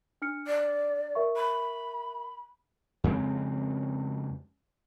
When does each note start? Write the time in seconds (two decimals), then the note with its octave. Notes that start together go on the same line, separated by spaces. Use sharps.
0.22 D4 F6 C#7
0.47 D5
1.15 A#4 E5 C#6
1.36 B5
3.04 F2 C#3 G#3 C4